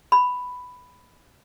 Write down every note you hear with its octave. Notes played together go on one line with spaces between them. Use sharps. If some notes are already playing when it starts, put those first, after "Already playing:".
B5